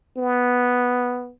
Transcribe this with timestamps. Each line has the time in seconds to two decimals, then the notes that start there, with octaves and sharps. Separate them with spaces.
0.17 B3